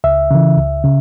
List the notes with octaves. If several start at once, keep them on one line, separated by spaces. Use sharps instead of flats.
C#2 E5
C#3 E3
C#2
C#3